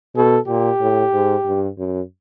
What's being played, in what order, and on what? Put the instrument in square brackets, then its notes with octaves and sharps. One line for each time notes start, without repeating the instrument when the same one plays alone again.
[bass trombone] B2 [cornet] A4
[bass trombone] A#2 [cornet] G4
[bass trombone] A2
G#2
G2
F#2